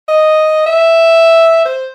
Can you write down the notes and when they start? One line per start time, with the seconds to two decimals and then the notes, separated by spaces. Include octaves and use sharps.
0.08 D#5
0.66 E5
1.65 C5